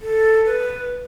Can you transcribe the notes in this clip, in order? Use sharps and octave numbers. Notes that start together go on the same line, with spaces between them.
A4
B4